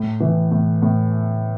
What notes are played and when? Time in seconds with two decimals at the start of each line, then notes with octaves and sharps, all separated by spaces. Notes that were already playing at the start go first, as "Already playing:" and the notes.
Already playing: A2
0.20 E3
0.51 A2
0.82 A2